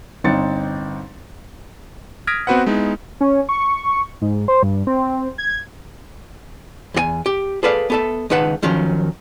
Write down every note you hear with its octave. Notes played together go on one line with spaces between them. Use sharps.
G1 C4 D#4 A6 C#7
D#6 F6 G#6 A#6 B6 D7
B3 C4 F#4 B4 C5 F#5
G#3 B3 D#4 E4
C#4
C#6
G#2
C5
G2
C4
G#6
E2 G4 G#5
G4
G#4 A4 B4 D5 F5
B3 A4 E5
C#2 D#3 D#4 B4 F#5 A5
D#2 D#3 F3 F#3 C#4